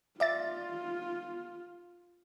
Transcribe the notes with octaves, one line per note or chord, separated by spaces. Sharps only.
F4 D5 E5 A6